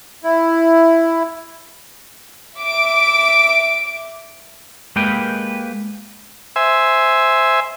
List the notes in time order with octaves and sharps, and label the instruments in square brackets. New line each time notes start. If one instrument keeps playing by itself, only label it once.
[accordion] E4
[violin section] E5 D6 D7
[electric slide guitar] G#3 A#3 G4 B4 G5
[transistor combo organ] C5 E5 G#5